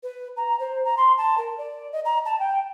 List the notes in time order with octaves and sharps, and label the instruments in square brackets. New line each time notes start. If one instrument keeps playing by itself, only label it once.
[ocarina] B4
A#5
C5
A#5
C6
A5
A#4
D5
D#5
A#5
A5
G5